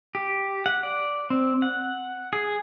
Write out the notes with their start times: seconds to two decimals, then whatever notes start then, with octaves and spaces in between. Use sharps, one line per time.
0.15 G4
0.66 F#5
0.83 D5
1.30 C4
1.62 F#5
2.33 G#4